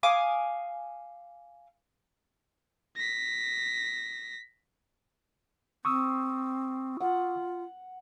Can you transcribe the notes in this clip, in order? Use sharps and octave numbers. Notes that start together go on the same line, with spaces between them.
F5 G#5 D6 D#6
A#6 B6
C4 C#6 D#6 E6
F4 F#5